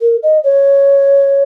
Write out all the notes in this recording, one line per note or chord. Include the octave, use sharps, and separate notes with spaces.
A#4
D#5
C#5